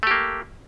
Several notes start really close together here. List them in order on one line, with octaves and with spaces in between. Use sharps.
A3 G4 A#3